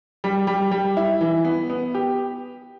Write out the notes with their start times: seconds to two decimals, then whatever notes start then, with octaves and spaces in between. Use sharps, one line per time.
0.24 G3
0.47 G3
0.71 G3
0.97 E4
1.21 E3
1.45 B3
1.70 B3
1.95 G4